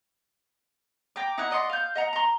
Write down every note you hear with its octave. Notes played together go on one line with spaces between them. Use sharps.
G5 A#5 D6
D#4 E4 F#5
D5 D#5 F#5 C6
F5 G6
D#5 F#5 A#5
A#5 C6